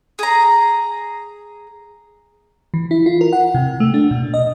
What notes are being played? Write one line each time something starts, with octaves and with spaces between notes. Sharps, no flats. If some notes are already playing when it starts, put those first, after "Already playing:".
G#4 A#5
E3
E4
F4
A#4
F#5
C3
A3
D4
B2
D#5